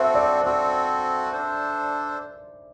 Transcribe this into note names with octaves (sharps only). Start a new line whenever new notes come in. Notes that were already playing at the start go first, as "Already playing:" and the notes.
Already playing: C4 F#4 A4 C5 E5
D5
C4 F#4 A4 D5
D4 A4 C5